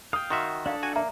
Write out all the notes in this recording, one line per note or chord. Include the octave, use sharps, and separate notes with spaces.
F5 G5 D#6
D#3 F#4 E5 C6
D4 A4 D5 F5
F#4 G#5
A#3 E5 A#5